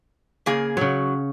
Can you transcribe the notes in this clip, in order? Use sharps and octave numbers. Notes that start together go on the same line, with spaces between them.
C#3 A#3 G#4
C#3 F#3 C#5